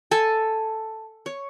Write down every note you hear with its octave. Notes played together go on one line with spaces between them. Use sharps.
A4 G#5 A5
C#5